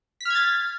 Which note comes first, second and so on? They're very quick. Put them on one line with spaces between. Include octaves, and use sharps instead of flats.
B6 F6 G#6 A6